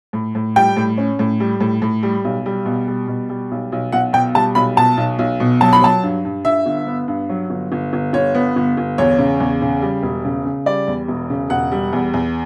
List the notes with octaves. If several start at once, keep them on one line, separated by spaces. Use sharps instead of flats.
A2
A2
G3 G5
A2
C#4
A2
G3
A2
A2
G3
B1
G3
B2
G3
B2
G3
B1
B1
B1 F#5
B2 G5
G3 A5
B1 B5
B2 A5
B1
B1
B2
F#3 A5
B5
F#3 A5
G2
G2
G2 E5
G1
B3
G2
F#3
G1
G1
G1
G1 C#5
B3
G1
G1
E2 C#5
C#3
E2
C#3
G3
E1
C#3
C#3
G3 D5
E2
E1
C#3
E1 F#5
G3
E2
E2